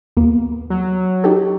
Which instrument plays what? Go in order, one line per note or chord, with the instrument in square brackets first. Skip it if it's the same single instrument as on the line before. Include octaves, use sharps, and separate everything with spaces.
[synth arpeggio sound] D#2 A#3 B3
[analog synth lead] F#3
[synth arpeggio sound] D#4 G4 A4